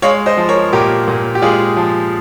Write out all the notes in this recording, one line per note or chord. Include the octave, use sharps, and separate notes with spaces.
G#3 C#5 F5
C5 D#5
F3
A#4 C#5
A#2 G4 A#4
A#2
G4
G#3 F4 G#4
F3